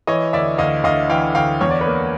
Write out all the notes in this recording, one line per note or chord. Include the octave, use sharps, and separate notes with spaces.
E3 C#5 D#5
D2 D5 E5
D2 D#5 F5
D2 D#5 F5
E3 F5 G5
D2 F5 G5
E2 C#5
D5
B4 C#5
A#3